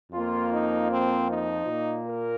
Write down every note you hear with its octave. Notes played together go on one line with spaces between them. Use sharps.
F2 F3 A#3 F4
D#4
C4
D#4
A#2 A#3
A#4